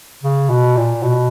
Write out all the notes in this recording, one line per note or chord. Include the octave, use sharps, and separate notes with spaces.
C#3
B2
A#2
B2